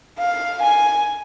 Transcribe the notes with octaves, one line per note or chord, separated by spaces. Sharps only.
F5
G#5